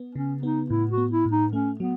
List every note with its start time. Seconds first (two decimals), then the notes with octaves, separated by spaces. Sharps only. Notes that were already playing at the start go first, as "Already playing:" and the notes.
Already playing: B3
0.15 C#3 C#4
0.43 B3 D#4
0.70 A2 E4
0.91 F#4
0.98 B3
1.11 E4
1.25 A2
1.32 D#4
1.52 A3 C#4
1.80 F#3 B3